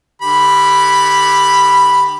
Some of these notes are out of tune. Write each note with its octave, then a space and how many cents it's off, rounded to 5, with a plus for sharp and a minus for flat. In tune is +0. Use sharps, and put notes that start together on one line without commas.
D3 +40 G4 +0 B5 +0